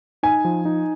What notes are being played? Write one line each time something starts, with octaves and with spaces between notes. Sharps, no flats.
D#4 G#5
F3
D#4